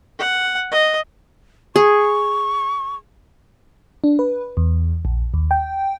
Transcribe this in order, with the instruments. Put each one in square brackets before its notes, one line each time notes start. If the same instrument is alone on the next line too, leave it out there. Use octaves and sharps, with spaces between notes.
[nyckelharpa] F#5
D#5
[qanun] G#4 [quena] C#6
[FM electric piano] D4
B4
E2
A#1
D#2
G5